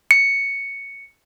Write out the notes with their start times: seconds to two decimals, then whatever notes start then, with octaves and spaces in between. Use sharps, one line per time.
0.11 C#7